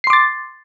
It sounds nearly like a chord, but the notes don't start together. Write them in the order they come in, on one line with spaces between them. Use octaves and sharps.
C7 C6 D6 A6